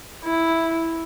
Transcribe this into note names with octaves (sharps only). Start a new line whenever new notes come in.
E4